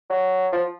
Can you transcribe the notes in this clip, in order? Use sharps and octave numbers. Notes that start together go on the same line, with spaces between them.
F#3
F3